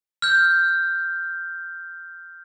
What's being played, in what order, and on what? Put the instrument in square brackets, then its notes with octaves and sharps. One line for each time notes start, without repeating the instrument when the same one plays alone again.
[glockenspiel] F6 G6